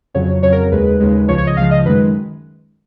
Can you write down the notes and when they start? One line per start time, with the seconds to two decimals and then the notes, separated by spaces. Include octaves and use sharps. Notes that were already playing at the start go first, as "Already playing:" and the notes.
0.14 F2 C#3 F#3 C#5
0.42 F2 C#3 F#3 C#5
0.52 A#4
0.72 D#2 C#3 G#3 B4
1.00 D#2 C#3 G#3
1.28 C#2 C#3 F3 C#5
1.38 C#5
1.47 D#5
1.57 C#2 C#3 F3 F5
1.71 D#5
1.86 F#2 D#3 G#3 B4